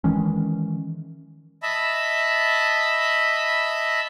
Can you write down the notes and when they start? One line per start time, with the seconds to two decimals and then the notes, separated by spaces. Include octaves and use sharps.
0.04 D#3 E3 G#3 C#4
1.63 D#5 E5 A5 B5